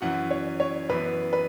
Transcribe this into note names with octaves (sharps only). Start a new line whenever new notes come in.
F#2 E3 C#4 F#4 F#5
C#5
C#5
F#2 E3 B3 B4
B4